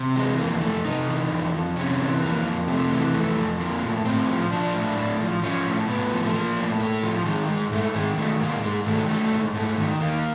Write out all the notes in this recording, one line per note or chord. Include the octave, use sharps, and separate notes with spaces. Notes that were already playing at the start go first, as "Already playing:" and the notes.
Already playing: C3
E3 G#3
F2 A#3
F2 A3
C3 D#4
E3
F2
F2
C3 C#4
E3
F2 A#3
F2
C3 A3
E3
F2 A3
F2
F3 A#3
A2
A2 C4
F3
F3 D4
A2
A2
F3
F3 C#4
A2
A2 B3
F3
A3
F3 A#3
A2
A2 A3
F3
D#3 G#3
G#2 G#3
G#2 A3
D#3 G#3
D#3 A3
G#2 A#3
G#2 G#3
D#3 A3
D#3 A3
G#2
G#2 A3
D#3
D#3 A#3